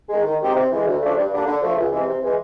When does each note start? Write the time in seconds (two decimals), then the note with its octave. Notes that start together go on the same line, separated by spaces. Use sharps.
0.09 D#3 G#3
0.24 D#3
0.40 G#3 C4 D#4 G4
0.55 C3
0.70 E3 G#3
0.86 D2
1.01 C#3 F3 A3 D4
1.16 G2
1.31 D3 G3 A#3 D4
1.46 D3
1.61 F3 A3
1.77 C#2
1.92 C3 E3 G#3
2.07 C3
2.21 E3 G#3